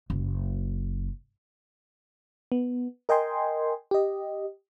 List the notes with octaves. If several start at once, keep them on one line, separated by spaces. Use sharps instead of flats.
F#1
B3
A#4 D#5 G5 G#5 C6
G4 D#5